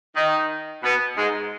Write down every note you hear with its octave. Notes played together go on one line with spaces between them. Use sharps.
D#3 D#4
B2 B3
G#2 G#3